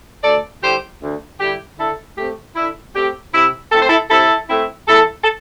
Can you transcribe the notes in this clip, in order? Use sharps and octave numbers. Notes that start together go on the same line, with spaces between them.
D2 A4 D5
D3 G3 E4 G4 C5
D2
D3 G3 E4 G4
D3 E4 A4
A3 C4 G4
D3 E4
A3 C4 G4
C3 E4
A3 C4 E4 A4
C5
E4 A4
C3 E4 A4
A3 C4 E4
E2 E4 A4
A4